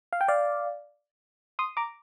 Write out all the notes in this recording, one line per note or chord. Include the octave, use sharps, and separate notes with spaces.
F5
G5
D5 F5
C6 D#6
A#5 D6